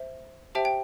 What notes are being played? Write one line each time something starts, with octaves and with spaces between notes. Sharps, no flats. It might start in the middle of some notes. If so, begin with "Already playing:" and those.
Already playing: C5 E5
G4 C5 E5 G5 A5
G5